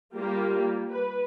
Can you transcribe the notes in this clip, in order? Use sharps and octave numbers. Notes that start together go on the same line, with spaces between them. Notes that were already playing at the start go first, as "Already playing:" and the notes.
G3 A#3 F4 G4
B4